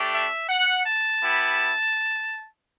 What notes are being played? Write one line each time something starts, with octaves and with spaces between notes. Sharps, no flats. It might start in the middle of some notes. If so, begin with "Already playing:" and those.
Already playing: A3 D4 G4
E5
F#5
A5
B3 E4 G4